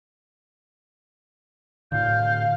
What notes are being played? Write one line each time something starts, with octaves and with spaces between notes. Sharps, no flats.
A2 D3 F5 G6